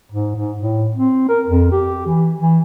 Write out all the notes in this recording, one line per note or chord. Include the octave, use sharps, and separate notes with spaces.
G#2
G#2
A2
C4
A#4
F2
G4
E3
E3